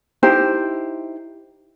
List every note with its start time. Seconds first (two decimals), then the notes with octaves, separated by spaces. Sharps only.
0.23 D#4 E4 G4 C5